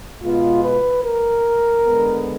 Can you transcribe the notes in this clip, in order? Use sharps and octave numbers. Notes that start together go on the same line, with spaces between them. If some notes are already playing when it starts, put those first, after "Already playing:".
B2 G#3 B3 F4
B4
A#4
D3 G#3 B3